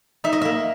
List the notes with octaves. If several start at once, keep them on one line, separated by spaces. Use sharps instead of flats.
D#4 E5
D#5
A#3 E5